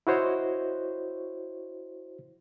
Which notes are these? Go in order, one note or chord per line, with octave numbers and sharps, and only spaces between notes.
E4 F#4 C5 C#5 D#5